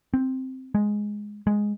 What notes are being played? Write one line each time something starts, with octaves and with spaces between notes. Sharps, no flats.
C4
G#3
G#3